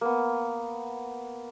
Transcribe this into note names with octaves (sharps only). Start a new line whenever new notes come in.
A#3 B3